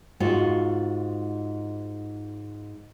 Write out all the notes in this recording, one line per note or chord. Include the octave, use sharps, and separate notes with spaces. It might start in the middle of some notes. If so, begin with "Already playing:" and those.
G#2 F4 F#4